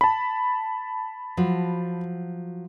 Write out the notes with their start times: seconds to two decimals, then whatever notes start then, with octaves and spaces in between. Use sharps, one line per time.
0.01 A5 B5
1.37 F3 F#3 F#4